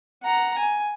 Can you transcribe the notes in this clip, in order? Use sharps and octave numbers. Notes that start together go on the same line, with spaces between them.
F#5 A#5
G#5